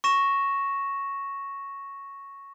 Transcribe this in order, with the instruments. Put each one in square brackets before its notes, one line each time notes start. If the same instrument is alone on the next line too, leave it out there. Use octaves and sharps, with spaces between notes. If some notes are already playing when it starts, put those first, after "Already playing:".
[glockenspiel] C#6 A#6 E7